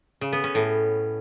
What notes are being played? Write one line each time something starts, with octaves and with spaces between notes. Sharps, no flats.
C#3
B3
C#4
A2